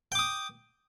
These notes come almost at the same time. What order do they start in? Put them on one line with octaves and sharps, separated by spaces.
G5 D6 D#6